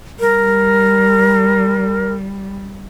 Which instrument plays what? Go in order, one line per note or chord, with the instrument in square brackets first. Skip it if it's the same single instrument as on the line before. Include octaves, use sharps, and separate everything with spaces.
[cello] G3 [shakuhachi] A#4